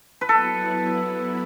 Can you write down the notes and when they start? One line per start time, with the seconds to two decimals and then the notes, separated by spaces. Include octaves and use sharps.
0.21 B4
0.29 F#3 B3 E4 A4